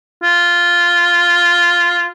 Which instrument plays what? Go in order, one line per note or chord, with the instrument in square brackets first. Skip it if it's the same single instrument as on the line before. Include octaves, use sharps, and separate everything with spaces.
[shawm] F4